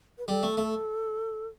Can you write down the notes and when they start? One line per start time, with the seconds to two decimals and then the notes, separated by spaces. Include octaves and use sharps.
0.18 B4
0.28 G3 A4
0.43 A3
0.57 A3